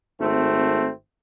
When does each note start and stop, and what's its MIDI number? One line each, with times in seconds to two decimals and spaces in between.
0.20 0.90 32
0.20 0.90 57
0.20 0.90 60